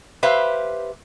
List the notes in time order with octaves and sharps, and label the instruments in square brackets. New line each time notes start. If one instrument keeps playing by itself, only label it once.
[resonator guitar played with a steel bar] G4 B4 C5 E5 F5